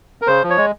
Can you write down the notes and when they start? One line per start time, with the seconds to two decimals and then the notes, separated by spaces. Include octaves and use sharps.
0.22 A#4
0.27 C#3 C5
0.43 F3
0.50 C#5
0.57 G#3